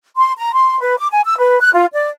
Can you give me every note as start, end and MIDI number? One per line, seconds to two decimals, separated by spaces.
0.16 0.32 84
0.37 0.53 82
0.54 0.78 84
0.81 0.96 71
0.98 1.07 86
1.11 1.21 80
1.25 1.38 88
1.38 1.59 71
1.61 1.71 90
1.73 1.85 65
1.93 2.08 74